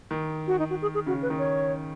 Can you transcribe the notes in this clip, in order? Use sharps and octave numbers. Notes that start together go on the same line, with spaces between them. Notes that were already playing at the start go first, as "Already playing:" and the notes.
D#3
F#4
D#4
F#4
G#4
G#4
C#3 F#4
B4
D#3
C#5